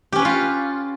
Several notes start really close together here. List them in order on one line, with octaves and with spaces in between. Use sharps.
G4 C#4 B4 C#5 F4